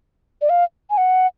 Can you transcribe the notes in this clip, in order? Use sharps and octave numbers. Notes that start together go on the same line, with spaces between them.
D5
F5
G#5
F#5